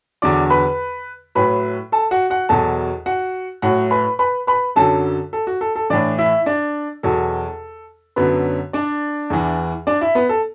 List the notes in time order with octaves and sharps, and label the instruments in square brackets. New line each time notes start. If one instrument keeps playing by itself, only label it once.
[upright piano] E2 D3 F#3 D5 D6
B4 B5
A2 F#3 B4 B5
A4 A5
F#4 F#5
F#4 F#5
E2 B2 F#3 A4 A5
F#4 F#5
A2 F#3 F#4 F#5
B4 B5
B4 B5
B4 B5
F#2 D3 F#3 A4 A5
A4
F#4
A4
A4
A2 E3 D4 D5
E4 E5
D4 D5
E2 B2 F#3 A4
F#2 D3 F#3 B3 B4
D4 D5
E2 E3
D4 D5
E4 E5
B3 B4
A4